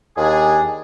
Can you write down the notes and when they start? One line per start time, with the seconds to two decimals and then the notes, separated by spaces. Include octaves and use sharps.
0.17 D#2 D4 G#4